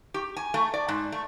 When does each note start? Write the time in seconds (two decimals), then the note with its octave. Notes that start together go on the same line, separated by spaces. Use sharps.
0.14 G4
0.36 G#5
0.54 A3
0.74 D5
0.88 G#2
1.12 A3